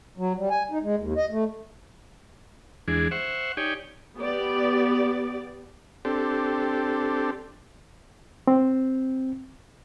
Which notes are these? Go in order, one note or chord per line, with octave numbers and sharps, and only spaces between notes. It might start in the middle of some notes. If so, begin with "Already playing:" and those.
F#3
G3
G#5
D#4
G#3
D#2
D#5
A3
E2 E3 G#3 D4 G#4
C5 E5 F#5 C#6
D#4 G4 C#5 D5 G5 G#5
B3 G4 D5
C4 D4 G4 A4
C4